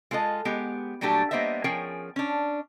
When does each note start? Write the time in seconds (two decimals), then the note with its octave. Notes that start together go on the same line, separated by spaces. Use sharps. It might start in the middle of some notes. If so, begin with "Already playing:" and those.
0.11 G#3 F4 A4 A#4 D#5
0.45 G#3 B3 G4
1.01 A#2 F#3 G3 A3 D4 G4
1.31 G3 A#3 B3 C5 D#5 E5
1.64 F3 C#4 G#4 A#4 C#5 G5
2.16 C#4 D4